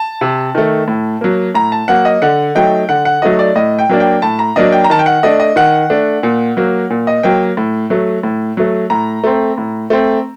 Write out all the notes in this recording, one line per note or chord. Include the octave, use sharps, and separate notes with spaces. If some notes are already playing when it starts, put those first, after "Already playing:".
Already playing: A5
C3
D#3 A3
A2
F#3 A#3
A2 A#5
A5
F#3 A#3 F#5
D#5
D3 F#5
F#3 A3 D#4 G5
D3 F#5
F#5
F#3 A3 D#4 D#5
D5
A2 D#5
G5
F#3 A#3 D4
G5
A2 A5
A#5
F#3 A#3 D4 D#5
G5
A#5
D#3 A5
G5
F#5
A3 D4 D#5
D#5
D#3 F#5
A3 D4
A#2
F#3 A#3
A#2
D#5
F#3 A#3 G5
A2
F#3 A3
A2
F#3 A3
A2 A#5
A3 C4
A2
A3 C4